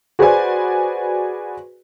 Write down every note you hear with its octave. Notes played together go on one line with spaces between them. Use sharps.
F#4 G#4 B4 C5 D5 G#5